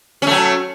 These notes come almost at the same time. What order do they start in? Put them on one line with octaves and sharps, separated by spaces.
C#4 A3 F#3